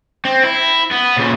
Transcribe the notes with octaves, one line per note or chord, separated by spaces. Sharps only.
C4
E4
B3
A#2 C#3